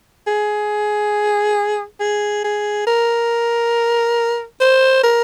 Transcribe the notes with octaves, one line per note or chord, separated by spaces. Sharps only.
G#4
G#4
G#4
A#4
C5
A#4